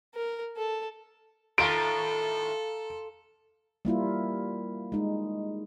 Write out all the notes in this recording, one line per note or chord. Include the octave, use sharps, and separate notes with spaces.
A#4
A4
A2 D#3 F4 A4 F5 A#5 C6 D7
G3 A#3 E4 F4
G#3 D#4